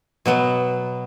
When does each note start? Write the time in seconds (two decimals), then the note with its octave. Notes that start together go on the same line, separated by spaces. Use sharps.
0.25 B2 F#3 B3